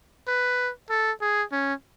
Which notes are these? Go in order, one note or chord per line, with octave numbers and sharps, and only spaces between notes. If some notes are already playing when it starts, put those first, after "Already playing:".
B4
A4
G#4
C#4